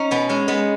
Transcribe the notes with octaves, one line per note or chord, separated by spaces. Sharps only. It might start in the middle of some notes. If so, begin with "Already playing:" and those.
Already playing: C#4 D#4
B2 B3
G#3 C#4
G#3 B3